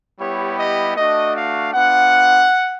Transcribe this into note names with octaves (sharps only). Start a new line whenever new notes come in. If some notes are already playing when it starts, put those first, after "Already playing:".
G3 B3 E4 G4 C#5
D#5
A3 D4 F#4 D#5
F5
B3 D4 F4 F#5